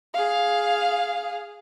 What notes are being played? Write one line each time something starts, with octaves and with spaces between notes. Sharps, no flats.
G#4 F5